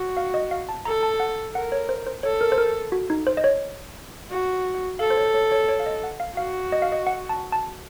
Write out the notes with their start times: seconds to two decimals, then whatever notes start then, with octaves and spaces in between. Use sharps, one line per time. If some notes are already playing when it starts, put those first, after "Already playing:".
Already playing: F#4
0.17 F5
0.34 D#5
0.51 F5
0.69 A5
0.85 A4 A#5
1.03 A5
1.20 F#5
1.55 A#4 F#5
1.72 C#5
1.89 C5
2.06 C5
2.23 A4 C#5
2.41 A#4
2.52 C5
2.58 A#4
2.92 F#4
3.10 D#4
3.27 C5
3.37 D#5
3.44 C#5
4.30 F#4
4.99 A4 F5
5.10 C5
5.17 C#5
5.34 C#5
5.52 C#5
5.69 C#5
5.80 F5
5.86 D#5
6.04 F#5
6.20 F5
6.37 F#4 F5
6.72 D#5
6.82 F5
6.92 D#5
7.07 F#5
7.29 A5
7.52 A5